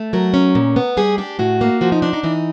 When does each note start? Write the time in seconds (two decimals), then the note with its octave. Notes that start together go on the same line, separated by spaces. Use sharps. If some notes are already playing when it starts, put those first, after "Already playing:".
Already playing: A3
0.13 F#3 A#4
0.34 C#4
0.55 A#2
0.76 B3
0.97 G3 G#4
1.18 D4 G4
1.39 A2 F#4
1.61 A#3
1.81 F3 F#4
1.92 D#4
2.02 D4 D#4
2.13 D#4
2.23 E3 D#4